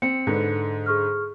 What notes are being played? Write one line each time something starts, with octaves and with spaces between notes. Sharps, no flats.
C4 C#7
G#2 D3 B4
G#4 C#6 F6